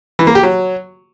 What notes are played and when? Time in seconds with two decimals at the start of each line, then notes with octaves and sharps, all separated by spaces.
0.19 E3
0.27 A#3
0.35 G4
0.43 F#3